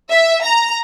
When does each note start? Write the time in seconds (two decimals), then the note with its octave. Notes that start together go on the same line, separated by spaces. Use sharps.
0.10 E5
0.43 A#5